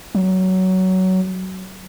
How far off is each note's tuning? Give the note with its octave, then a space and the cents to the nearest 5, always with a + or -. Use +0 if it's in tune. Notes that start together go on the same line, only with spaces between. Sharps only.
F#3 +15